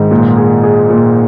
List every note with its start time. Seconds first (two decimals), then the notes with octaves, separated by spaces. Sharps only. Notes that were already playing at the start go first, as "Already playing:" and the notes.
Already playing: G#2 D#3
0.11 A#2
0.37 G#4
0.63 G#4
0.90 A#2